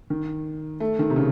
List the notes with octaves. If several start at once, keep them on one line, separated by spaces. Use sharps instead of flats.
D#3
A3
D#3
C3
C#3